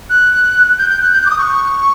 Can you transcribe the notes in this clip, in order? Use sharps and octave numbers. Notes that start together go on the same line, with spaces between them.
F#6
G6
G6
F#6
G6
F#6
D6
D#6
C#6